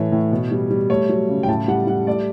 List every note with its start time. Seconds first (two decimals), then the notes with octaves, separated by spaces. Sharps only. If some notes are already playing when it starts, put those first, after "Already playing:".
Already playing: A2 E3 A3 C#5
0.12 A2
0.32 B2
0.51 G3
0.70 G3
0.90 A3 C#5
1.09 F#3
1.29 C#3
1.43 G5
1.48 A2 A5
1.68 G3 F#5
1.87 G3 F#5
2.07 A3 D5